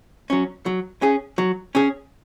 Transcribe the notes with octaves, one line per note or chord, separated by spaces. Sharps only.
F#3 C#4
F#3
C#4 G#4
F#3
C#4 G#4